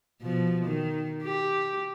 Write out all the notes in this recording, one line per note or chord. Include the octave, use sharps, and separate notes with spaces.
B2 F3
D#3
G4